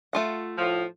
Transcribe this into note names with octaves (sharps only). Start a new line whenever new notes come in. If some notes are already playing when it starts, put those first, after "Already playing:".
A3 F4 F#5
A2 F3